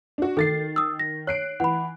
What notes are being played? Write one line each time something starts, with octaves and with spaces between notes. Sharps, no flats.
D4 F#4
D#3 A4 A6 C7
D#6 E6
A#6
C#5 F#6 C7 D7
E3 F#5 B5